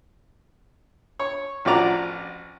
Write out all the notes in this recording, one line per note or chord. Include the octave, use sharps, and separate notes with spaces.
C#5
A1 F3 F#4 D5 A#5